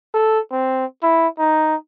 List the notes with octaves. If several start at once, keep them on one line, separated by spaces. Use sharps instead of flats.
A4
C4
E4
D#4